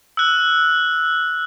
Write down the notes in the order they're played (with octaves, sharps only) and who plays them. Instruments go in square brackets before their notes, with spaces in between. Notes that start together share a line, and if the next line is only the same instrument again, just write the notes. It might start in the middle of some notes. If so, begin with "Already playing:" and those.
[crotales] E6 F#6